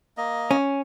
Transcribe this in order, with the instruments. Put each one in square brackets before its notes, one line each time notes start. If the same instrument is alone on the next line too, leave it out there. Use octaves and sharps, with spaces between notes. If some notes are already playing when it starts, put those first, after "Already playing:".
[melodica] A#3 D#5
[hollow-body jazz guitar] C#4